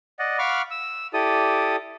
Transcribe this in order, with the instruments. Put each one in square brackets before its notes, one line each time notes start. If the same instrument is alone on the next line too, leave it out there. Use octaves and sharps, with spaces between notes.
[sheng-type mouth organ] D5 D#5 F#5
F5 F#5 B5 C#6 D6 F6
E6
E4 G4 A4 D5 D#6